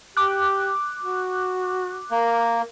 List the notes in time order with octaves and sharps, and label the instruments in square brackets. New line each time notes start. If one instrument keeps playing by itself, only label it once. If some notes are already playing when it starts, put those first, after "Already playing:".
[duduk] G4 [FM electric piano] D6 F#6
[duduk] F#4
[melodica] A#3 [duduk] A#4